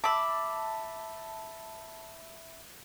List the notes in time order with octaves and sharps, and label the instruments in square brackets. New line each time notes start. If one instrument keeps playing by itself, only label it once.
[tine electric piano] E5 B5 [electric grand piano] A5 [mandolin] D6 E6